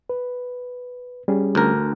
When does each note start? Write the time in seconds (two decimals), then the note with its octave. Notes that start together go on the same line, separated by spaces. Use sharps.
0.09 B4
1.28 G3 C#4 G#4
1.55 D2 A#4